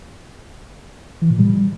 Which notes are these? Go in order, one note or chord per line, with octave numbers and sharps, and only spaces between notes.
E3
A#2
G3